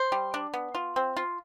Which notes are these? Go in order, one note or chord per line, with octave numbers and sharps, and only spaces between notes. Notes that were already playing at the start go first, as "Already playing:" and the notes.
Already playing: C5
G3
D4
B3
F4
C4
F4